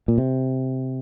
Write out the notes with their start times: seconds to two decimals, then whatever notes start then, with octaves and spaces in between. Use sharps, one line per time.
0.08 A#2
0.18 C3